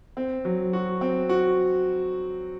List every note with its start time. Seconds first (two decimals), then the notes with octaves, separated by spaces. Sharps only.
0.17 C4
0.45 F#3
0.73 F#4
1.01 C4
1.29 F#4